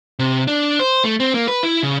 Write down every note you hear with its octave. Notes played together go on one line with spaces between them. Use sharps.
C3
D4
C5
A3
C4
A#3
B4
E4
C#3